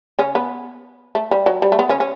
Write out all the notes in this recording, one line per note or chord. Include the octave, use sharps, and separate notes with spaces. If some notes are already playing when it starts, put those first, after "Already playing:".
C#3 C#4
B3
A3
G3
F#3
G3
A3
B3
C#3 C#4
C#4